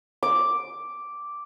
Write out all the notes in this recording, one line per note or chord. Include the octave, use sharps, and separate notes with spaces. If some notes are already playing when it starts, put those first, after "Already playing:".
D6